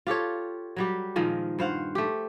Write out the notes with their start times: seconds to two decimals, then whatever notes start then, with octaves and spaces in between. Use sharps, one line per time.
0.07 F4 G4 A4 C#5
0.76 F#3 G3 G4
1.16 A#2 D#3 F3 G#3
1.59 G2 C5 F5 F#5
1.95 A3 G4